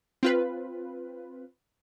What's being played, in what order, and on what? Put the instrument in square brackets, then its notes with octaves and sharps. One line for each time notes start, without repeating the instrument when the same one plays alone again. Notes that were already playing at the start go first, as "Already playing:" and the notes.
[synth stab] C4 F4 B4